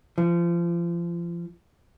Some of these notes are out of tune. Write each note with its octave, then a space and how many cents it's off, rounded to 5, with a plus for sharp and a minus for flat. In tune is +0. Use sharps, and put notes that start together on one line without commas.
F3 -30